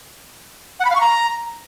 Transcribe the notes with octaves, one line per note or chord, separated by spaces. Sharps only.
F#5
B5
F5
C#6
A#5